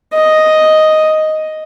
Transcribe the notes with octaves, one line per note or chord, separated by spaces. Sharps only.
D#5